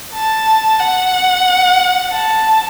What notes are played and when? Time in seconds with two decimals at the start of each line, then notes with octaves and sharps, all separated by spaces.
0.13 A5
0.80 F#5
2.12 A5